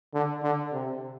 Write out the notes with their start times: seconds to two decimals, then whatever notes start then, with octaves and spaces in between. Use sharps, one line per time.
0.14 D3
0.43 D3
0.73 C3